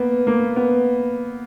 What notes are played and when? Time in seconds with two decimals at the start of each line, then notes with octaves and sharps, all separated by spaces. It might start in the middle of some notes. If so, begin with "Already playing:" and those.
Already playing: A#3 B3
0.27 A#3
0.56 B3